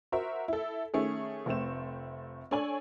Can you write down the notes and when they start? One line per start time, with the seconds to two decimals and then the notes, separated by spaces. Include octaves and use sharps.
0.12 F#4 A#4 C5 E5
0.48 E4 A4
0.94 D#3 A3 C#4 G#4
1.46 F1 A3 C4 E7
2.51 D4 A4 C#5 G#5 C#6 F#7